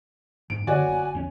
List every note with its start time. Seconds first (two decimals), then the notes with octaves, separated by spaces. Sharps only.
0.50 F#1 G#2 D7
0.67 D3 F#4 C#5 D5 G#5
0.88 G1
1.15 E2 C#4